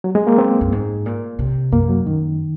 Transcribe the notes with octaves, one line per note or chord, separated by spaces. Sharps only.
F#3
G#3
A#3
C4
F#2
G#2
A#2
C3
F#2 A#3
F#3
F#2 D#3